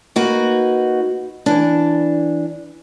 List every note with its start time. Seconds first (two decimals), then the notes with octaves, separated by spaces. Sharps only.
0.16 A#3 D#4 F#4 B4
1.46 E3 D4